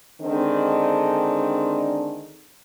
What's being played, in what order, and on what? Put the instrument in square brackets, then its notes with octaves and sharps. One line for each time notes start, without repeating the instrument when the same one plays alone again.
[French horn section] D3 D#3 G#3 C4 D4